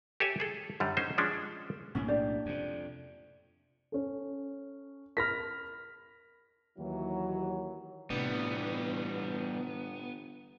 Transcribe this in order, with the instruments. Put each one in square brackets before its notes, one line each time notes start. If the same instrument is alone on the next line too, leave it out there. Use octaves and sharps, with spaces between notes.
[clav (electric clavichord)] G4 A4 C#5 E5 G#5
G#4 A4
F#2 D3 G3
C#4 D#4 C5
F3 G#3 C#4 D4
[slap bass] B1 A2 A#3 [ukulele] C#4
[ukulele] D4 G4 D5
[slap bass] F2 C3
[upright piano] C#4 A4
[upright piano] A#4 B5 [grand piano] F6 A#6 B6
[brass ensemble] D#2 E3 F#3
[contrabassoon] G1 [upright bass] A2 C3 [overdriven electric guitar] E3 G3 [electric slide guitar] B3